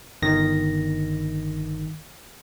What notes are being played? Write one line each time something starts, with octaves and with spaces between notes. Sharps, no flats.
G1 D#3 A#6